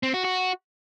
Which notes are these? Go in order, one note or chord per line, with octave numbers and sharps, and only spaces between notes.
C4
F#4
F#4